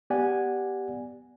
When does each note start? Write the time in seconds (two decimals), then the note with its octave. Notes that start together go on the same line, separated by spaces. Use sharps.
0.10 B3 G4 D5 F#5 G#5